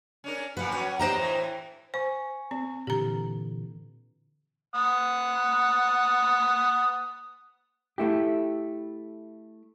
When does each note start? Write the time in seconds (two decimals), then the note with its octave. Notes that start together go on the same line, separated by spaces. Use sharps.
0.24 C#4 D4 A#4
0.57 A#2 F3 B3 B4 F#5
0.71 F#3 C#4 F#4
0.99 D4 G4 B4 C5 D#5 A#5
1.17 A2 E3
1.94 C5 G#5 C#6
2.51 C4
2.87 A#2 D3 E3 G4 A#5
4.75 F#5 D#6
7.98 A3 E4 G4